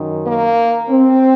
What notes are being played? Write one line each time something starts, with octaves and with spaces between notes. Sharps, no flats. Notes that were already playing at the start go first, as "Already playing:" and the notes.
Already playing: F#2 D#3
A#3
C4